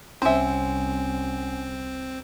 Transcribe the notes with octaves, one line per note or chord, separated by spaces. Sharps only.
C2 C4 C#4 C5 E5 G#5